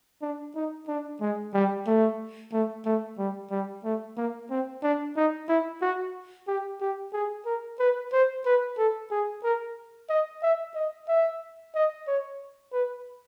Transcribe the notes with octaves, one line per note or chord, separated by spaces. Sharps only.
D4
D#4
D4
G#3
G3
A3
A3
A3
G3
G3
A3
A#3
C4
D4
D#4
E4
F#4
G4
G4
G#4
A#4
B4
C5
B4
A4
G#4
A#4
D#5
E5
D#5
E5
D#5
C#5
B4